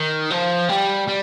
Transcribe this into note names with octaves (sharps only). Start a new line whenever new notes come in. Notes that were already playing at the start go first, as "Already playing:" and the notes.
Already playing: D#3
F3
G3
G3